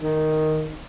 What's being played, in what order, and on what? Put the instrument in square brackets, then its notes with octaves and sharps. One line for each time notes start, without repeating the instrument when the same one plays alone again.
[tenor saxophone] D#3